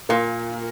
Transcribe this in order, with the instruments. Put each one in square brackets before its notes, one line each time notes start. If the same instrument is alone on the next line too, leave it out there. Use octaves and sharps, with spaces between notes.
[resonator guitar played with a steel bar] A#2 [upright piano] A#3